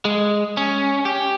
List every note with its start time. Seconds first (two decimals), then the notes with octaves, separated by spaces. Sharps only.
0.05 G#3
0.57 C#4
1.05 G4